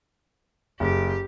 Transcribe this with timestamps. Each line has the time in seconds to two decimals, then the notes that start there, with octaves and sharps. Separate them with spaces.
0.80 F#1 G4